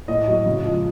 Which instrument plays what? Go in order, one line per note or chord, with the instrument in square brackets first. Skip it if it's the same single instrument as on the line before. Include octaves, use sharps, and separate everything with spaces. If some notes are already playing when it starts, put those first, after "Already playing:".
[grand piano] A2 D#5
F#3
C#3
F3 G#3